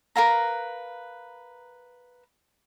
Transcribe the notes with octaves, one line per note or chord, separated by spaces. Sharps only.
A#4 B4 F5 A#5